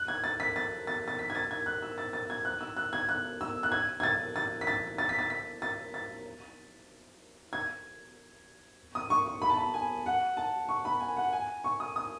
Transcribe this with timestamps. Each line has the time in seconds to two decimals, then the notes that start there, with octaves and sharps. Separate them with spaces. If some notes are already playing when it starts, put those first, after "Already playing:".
Already playing: F#6
0.08 G#6
0.24 A6
0.40 B6
0.56 A6
0.87 A6
1.08 A6
1.19 B6
1.30 G#6
1.35 A6
1.51 G#6
1.66 F#6
1.82 E6
1.98 A6
2.13 A6
2.30 G#6
2.45 F#6
2.61 E6
2.77 F#6
2.93 G#6
3.09 F#6
3.41 E6
3.63 F#6
3.72 G#6
4.00 G#6
4.03 A6
4.36 A6
4.61 B6
4.67 A6
4.98 A6
5.09 B6
5.19 A6
5.30 B6
5.62 A6
5.94 A6
7.53 G#6
8.95 D#6
9.10 C#6
9.26 C#6
9.42 B5
9.50 A5
9.56 B5
9.74 G#5
10.06 F#5
10.37 A5
10.69 C#6
10.85 B5
11.00 G#5
11.16 F#5
11.33 G#5
11.64 C#6
11.80 D#6
11.96 D#6